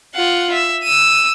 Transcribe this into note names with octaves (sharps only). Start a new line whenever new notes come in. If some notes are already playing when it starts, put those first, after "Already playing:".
F4 F#5
E5
E6 D#7